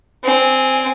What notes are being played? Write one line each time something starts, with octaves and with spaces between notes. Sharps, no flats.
C4 G#5